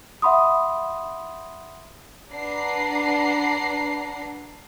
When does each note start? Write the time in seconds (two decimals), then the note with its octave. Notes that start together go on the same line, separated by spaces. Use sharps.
0.22 E5 F#5 B5 C6 D#6
2.32 D4 B4 F#5 A#5 C7